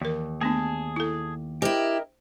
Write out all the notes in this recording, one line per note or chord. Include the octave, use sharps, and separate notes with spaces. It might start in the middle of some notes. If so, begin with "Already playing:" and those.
D#2 E3 A#4
A3 B3 D4 G#4 A5
E4 A4
E4 G4 A#4 C5 D#5 G5